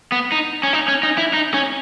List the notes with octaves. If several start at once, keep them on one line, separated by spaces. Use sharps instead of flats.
B3
D#4
C#4
D#4
C#4
D#4
E4
D#4
C#4